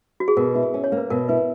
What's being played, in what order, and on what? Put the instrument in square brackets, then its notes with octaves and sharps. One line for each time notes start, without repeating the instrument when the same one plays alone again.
[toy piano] F#4
G#4
[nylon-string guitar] B2 [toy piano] A#4
[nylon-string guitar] E4
C#4
[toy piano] C#5
[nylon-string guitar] A#3
[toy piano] B4
[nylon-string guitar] B2 [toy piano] A#4
[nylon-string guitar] E4 [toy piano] B4